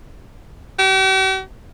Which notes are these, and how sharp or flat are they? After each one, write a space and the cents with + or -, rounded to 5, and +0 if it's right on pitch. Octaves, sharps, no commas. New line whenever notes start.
G4 -45